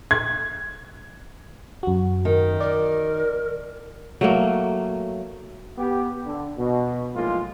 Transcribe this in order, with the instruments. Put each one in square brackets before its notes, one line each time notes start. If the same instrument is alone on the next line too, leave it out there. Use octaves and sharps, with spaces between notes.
[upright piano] G#6
[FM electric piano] F#2 F#4
[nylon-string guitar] D#3
[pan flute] A#4 [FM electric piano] D5
[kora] F#3 A3 A#3
[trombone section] B3 G4
D3
B2
B1 A2 F3 G#3 A#3 F4